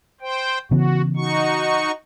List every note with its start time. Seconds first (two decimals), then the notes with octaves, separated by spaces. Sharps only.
0.21 C5 G5
0.71 C#3 E3 B3 F#4
1.17 D#4 F#4 C#6